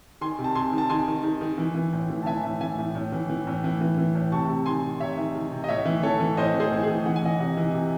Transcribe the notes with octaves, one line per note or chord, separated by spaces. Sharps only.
D#3 G#5 C6
C3
A5
C3 G#5 C6
D#3
A5
D#3 G#5 C6
D#3
D#3
D#3
E3
E3
A2
E3
A5
E3 E5 G#5
A2
E3 E5 G#5
A2
A2
E3
E3
A2
E3
E3
E3
A2
C3 A5 C#6
C3
D#3 G#5 C6
C3
C3 C#5 E5
D#3
D#3
C3
D#5
A2 C#5 E5
E3
E3 A4 C#5
E3
A2 C5 D#5
E3
G#4 C5
A2
G#4
E3
E3 F#5
G#5
E3 D#5 F#5
C3 D#5 F#5
E3
C3